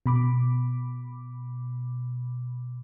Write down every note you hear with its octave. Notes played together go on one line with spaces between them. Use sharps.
B2 B5 D6